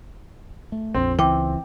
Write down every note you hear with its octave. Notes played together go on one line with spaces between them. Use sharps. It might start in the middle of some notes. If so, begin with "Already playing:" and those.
A3
A#1 F2 C4
C#2 E3 C4 G5 D6